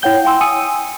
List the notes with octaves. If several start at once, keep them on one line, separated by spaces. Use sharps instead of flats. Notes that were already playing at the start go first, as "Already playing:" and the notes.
E4 C#5 F#5 G5 G6 G7
F5 G5 G#5 C6 E6
G#5 D#6 E6 C#7 D#7